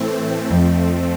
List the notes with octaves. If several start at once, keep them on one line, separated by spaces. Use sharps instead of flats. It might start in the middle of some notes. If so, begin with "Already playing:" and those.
Already playing: A2 E3 A3 C4
F2 F3 A3 C4